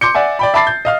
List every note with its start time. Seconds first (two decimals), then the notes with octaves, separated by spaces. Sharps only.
0.01 C6 D6 G6 C#7
0.15 D5 E5 F#5 G#5
0.39 D5 G5 B5
0.54 E5 A5 B5 D6 A6 C7
0.67 G6
0.85 D#5 F5 F6